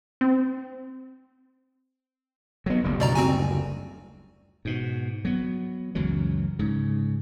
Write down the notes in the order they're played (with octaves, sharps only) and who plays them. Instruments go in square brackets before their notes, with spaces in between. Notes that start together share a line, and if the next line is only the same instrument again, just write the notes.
[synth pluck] C4
[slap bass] F#3 B3
F#1 D2 G3
[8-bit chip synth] B2 D5 A#5
C4 F#4 G#5
[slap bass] G#2 B2
F#3 B3
C#2 F#2 E3 F#3
G#2 C#3